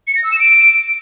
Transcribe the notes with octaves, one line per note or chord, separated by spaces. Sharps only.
C#7
A#6
E6
E7
D7